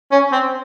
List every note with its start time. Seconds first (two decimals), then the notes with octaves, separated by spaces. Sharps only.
0.11 C#4
0.32 C4